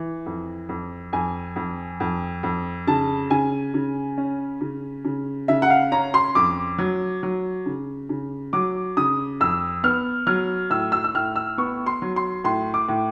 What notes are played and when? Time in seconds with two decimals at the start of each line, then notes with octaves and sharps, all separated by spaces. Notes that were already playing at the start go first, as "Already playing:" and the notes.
Already playing: E3
0.26 F2
0.69 F2
1.13 F2 G#5
1.56 F2
2.00 F2
2.43 F2
2.87 C#3 A5
3.31 C#3 G#5
3.74 C#3
4.18 C#4
4.61 C#3
5.05 C#3
5.48 C#3 E5
5.62 F#5
5.70 F5
5.92 C#4 A#5
6.14 C6
6.35 F2 D6
6.78 F#3
7.23 F#3
7.66 C#3
8.09 C#3
8.53 F#3 D6
8.97 C#3 D#6
9.40 F2 E6
9.83 B3 F6
10.27 F#3 F6
10.70 A2 E6
10.92 E6
11.04 E6
11.15 A2 F6
11.36 E6
11.58 B3 C#6
11.86 C6
12.02 F#3
12.16 C6
12.44 A2 C6
12.74 D6
12.89 A2